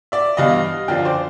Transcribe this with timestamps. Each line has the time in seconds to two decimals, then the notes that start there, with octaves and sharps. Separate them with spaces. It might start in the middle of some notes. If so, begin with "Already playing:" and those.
0.12 D5 E5
0.37 G2 E3 G3 B3 D#5 F5
0.88 F#2 D3 F3 F5 G5
1.05 C5 D5